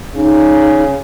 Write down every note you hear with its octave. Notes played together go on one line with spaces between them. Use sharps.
C#3 D#4